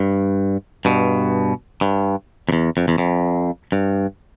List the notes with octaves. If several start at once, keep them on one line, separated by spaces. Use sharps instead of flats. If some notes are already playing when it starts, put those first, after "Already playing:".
Already playing: G2
G2 B2
G2
F2
E2
F2
E2
F2
G2